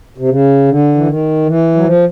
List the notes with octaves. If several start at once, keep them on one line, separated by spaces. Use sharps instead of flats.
C3
C#3
D3
E3
D#3
E3
F#3
F3